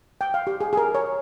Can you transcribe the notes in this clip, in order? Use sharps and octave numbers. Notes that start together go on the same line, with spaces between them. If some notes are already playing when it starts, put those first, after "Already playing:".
G5
F5
G4
G#4
G#4
A#4
C#5